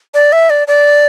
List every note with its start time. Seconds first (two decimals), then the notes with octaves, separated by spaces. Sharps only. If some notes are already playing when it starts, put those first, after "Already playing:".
0.14 D5
0.32 E5
0.50 D5
0.68 D5